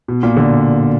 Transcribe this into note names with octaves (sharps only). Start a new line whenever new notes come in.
B2
A#2
D3